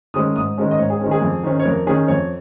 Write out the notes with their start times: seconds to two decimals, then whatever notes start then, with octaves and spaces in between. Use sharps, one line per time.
0.14 D#3 G#3 C#4 D#6
0.36 G#2 D#6
0.58 D#3 G#3 C#4
0.71 D#5
0.79 G#2 C#5
0.90 G#4
1.01 D#3 G#3 C#4
1.11 G#4
1.22 F2
1.43 D#3 C#4
1.60 C#5
1.66 F2 A#4
1.87 D#3 C#4 G#4
2.08 F2 C#5